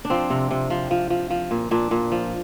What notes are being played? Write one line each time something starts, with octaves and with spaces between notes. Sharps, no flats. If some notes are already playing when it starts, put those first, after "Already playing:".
D4
F3 C4
C3
C3
F3
F3
F3
F3
A#2
A#2 D4
A#2
F3